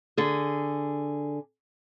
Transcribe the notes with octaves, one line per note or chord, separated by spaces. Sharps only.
D3 G#4